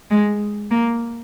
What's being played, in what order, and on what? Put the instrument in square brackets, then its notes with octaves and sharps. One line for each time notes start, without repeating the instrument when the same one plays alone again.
[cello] G#3
A#3